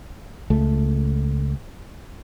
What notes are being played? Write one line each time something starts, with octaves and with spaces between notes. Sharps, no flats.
C#2 A3